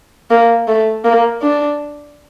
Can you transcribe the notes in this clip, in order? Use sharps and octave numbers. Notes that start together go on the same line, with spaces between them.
A#3
A3
A#3
D4